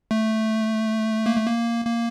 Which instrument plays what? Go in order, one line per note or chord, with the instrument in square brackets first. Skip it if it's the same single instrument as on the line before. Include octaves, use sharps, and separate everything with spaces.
[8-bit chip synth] A3
A#3
A3
A#3
A#3